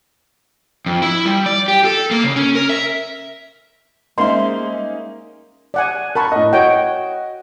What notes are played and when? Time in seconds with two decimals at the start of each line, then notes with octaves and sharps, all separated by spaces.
0.86 F2
1.02 E4
1.25 G3
1.46 D5
1.68 G4
1.85 A4
2.11 A#3
2.24 C#3
2.36 C#4
2.55 A#4
2.70 E5
4.18 G3 G#3 A#3 C#4 D#4 C5 E5 C6
5.74 D5 F#5 G#5
6.15 A#4 A5 B5 C#6 F#6
6.32 A2 D#5
6.53 F#4 C#5 D#5 G5